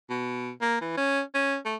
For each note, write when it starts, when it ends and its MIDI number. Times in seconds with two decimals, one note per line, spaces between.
0.10 0.51 47
0.61 0.80 58
0.81 0.93 52
0.97 1.21 61
1.35 1.56 61
1.65 1.76 57